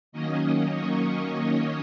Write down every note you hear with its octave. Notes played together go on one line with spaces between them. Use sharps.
D#3 F#3 A#3 C#4 D#5
C#5